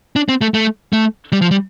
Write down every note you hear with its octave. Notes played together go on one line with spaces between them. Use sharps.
D4
C4
A3
A3
A3
G3
F3
G3